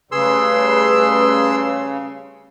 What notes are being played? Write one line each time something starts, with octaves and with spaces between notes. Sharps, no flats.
C#3 G3 A3 G#4 B4 C6 E6